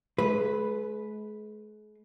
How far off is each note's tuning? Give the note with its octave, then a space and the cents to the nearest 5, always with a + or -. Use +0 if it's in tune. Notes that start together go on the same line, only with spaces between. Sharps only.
G#3 +40 B4 +0